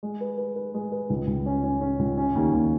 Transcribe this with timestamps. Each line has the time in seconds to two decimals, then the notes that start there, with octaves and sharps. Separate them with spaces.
0.03 G#3
0.21 B4
0.38 B4
0.56 B4
0.74 G#3
0.92 B4
1.10 C#2
1.27 C#2
1.46 C#4
1.64 C#4
1.81 C#4
1.99 C#2
2.18 C#4
2.35 D#2
2.52 D#2